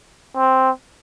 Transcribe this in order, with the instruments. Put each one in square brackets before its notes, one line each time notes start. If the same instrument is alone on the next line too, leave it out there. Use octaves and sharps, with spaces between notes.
[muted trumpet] C4